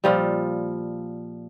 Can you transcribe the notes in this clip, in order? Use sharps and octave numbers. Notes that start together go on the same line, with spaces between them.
A#2 F3 G3